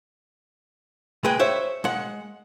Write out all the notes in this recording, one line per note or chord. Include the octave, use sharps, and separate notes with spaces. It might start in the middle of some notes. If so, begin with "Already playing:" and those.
G#3 G#4 B4 G5
C5 C#5 E5
G#3 F#5